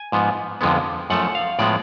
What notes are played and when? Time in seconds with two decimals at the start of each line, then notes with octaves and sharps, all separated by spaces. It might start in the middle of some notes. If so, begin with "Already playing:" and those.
Already playing: G#5
0.12 G#2 F3 B3
0.61 F2 D3 F3 G#3 B3
1.10 F#2 F3 A3 F#5
1.35 F5
1.59 A2 F3 G#3 B3 D5